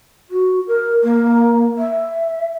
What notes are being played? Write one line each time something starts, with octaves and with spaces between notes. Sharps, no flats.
F#4
A#4
A#3
E5